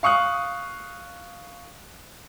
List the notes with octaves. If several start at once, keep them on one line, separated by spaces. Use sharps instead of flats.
F5 C#6 D#6 F#6